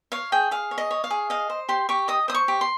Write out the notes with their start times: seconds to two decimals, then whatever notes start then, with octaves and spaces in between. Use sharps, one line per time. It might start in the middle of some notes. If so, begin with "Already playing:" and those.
0.12 C#5 F5
0.32 G#4 G5
0.51 G#4 F5
0.71 C#5
0.78 D#5
0.91 C#5
1.04 F5
1.10 G#4
1.30 D#5 F5
1.50 C5
1.69 G4 C6
1.89 G4 C#6
2.08 D#5 D#6
2.28 C5 D#6
2.34 C#6
2.48 G4
2.61 C6